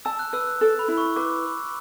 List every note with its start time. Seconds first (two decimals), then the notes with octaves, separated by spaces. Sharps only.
0.05 A5 E6
0.19 F#6
0.33 B4 E6
0.47 F#6
0.61 A4
0.79 B5
0.88 E4
0.98 C#6
1.16 B4 D6